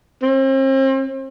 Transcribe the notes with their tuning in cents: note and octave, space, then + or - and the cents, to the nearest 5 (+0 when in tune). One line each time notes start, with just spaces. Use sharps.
C4 +40